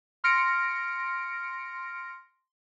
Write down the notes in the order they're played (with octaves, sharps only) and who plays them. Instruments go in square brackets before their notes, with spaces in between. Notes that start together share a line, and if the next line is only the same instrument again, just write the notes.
[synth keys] C6 F6 A#6 C#7 D7